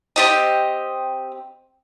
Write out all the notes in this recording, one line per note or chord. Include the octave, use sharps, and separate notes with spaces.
C4 G4 D#5